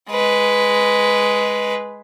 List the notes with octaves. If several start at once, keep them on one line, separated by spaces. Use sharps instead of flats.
G#3 B4